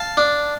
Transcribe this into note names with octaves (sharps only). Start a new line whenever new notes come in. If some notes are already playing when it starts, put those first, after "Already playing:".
Already playing: F5 A5
D4